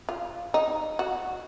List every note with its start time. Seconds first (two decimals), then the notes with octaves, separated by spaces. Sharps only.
0.09 F4
0.54 D#4
0.99 F#4